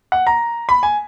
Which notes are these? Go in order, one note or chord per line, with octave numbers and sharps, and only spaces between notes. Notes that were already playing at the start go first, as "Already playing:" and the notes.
F#5
A#5
B5
G#5